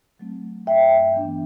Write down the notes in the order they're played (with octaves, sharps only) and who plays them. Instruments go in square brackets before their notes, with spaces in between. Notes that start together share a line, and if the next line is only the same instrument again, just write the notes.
[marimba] F#3 A3 C4
G2 E5 G5
E3 B3 D4